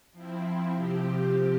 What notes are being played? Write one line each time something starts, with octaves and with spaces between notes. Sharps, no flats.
F3 C4 E4
C3 F3 C4 G4